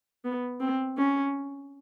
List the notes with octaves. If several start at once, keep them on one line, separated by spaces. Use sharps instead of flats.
B3
C4
C#4